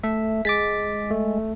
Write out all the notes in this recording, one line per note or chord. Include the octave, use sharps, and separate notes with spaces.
A3 E5
G#3 D6 A6 B6
A3